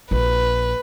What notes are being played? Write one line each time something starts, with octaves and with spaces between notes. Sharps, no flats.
A#1 B4